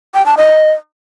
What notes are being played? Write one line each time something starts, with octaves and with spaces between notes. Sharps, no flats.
G5
A5
D#5